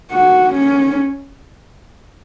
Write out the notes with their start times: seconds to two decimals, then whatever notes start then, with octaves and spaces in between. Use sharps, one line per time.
0.11 F#4
0.53 C#4